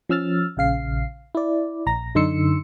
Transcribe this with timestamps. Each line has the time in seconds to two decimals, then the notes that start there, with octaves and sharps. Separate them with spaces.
0.09 F3 C#4 E6 F6 A6
0.57 A#1 C#3 F5 C7
1.35 E4 D5
1.86 A#1 A#5 A#6
2.15 F#2 D3 D#4 C6 E6 C#7